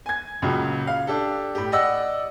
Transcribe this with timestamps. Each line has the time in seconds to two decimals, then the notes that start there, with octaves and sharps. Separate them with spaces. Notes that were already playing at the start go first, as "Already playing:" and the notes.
0.06 G#5 G#6
0.42 C#2 A#2 C#3 F#3
0.87 F5
1.07 D4 G4 A4
1.55 A2 G4
1.72 D5 D#5 F#5 E6